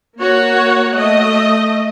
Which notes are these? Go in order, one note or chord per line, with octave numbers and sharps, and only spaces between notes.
A#3 F#4 C#5
A3 D#5